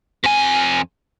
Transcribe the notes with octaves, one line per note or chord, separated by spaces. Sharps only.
F2 G#5